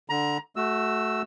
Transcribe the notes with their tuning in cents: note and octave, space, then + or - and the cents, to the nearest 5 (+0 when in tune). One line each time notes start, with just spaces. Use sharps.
D3 +0 A#5 +25
A3 -15 F#4 +5 E6 +0